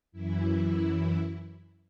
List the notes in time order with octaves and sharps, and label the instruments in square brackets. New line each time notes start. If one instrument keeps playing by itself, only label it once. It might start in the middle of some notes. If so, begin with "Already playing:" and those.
[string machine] F#2 E3 E4